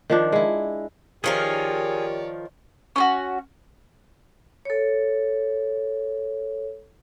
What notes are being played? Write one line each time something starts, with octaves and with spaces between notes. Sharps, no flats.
D#3 F3 D4
G#3 E4
D#3 F3 G4 G#4 A#4 C#5 D5
C#4 F4 F#4
A4 C#5